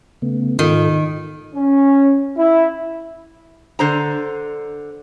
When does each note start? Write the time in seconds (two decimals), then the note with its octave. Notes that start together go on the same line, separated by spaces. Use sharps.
0.22 C#3 A3 B3
0.59 G#2 D#3 F4 A4
1.55 C#4
2.37 E4
3.79 D3 C5 A#5